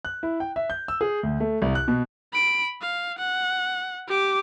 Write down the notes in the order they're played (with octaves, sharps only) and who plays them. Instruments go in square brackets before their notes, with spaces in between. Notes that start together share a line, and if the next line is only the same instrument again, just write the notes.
[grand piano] F#6
E4
G5
E5
G6
E6
G#4
D2
A3
C2
F#6
B2
[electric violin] B5 D7
F5
F#5
G4 D6